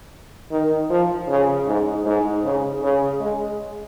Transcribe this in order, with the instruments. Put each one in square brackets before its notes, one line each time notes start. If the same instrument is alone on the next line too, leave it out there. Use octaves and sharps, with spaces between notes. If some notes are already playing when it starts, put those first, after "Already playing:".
[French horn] D#3
F3
C#3
G#2
G#2
C#3
C#3
G#3